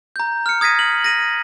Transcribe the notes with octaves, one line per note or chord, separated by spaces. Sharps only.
A#5 G6
F6 C#7
D#6 G#6 A#6 B6 D#7
F#7
A#6 D#7 F#7